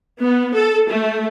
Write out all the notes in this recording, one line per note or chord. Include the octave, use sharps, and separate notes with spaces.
B3
A4
A3